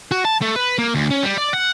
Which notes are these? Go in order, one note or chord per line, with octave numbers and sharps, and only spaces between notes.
F#4
A5
A3
B4
A#3
D2
C#4
G3
D5
F#5